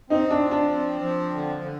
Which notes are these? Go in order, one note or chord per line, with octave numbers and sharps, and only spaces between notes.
C4 D#4
D4
F3
D4
C4
F3
D3
D3